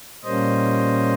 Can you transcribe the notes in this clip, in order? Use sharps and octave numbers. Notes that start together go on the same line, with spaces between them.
A#2 G3 A#3 C#4 C5 D#5